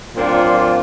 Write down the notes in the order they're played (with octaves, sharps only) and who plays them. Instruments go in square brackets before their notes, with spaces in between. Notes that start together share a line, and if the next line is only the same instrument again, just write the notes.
[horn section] A#2 F#3 C4 D4 F4